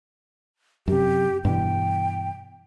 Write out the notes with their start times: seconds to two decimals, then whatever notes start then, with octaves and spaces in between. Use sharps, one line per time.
0.88 F#2 C3 G4
1.45 G2 B2 E3 G5